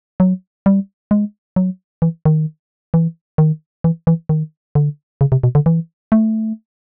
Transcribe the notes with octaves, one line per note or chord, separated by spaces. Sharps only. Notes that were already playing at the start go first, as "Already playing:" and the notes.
F#3
G3
G#3
F#3
E3
D#3
E3
D#3
E3
E3
D#3
D3
C#3
C3
B2
D3
E3
A3